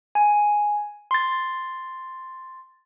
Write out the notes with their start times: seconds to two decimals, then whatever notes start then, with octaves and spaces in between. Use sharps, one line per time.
0.15 G#5
1.11 C6 A6